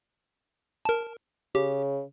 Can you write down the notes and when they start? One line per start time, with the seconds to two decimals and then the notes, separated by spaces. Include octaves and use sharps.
0.85 A#4 A5
1.55 C#3 G4